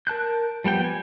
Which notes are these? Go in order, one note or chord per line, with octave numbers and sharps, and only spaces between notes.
A#4 A5 F#6 G6
F3 G3 B3 G5
G#5